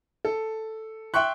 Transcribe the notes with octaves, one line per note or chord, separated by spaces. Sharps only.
A4
E5 G5 C6 C#6 F#6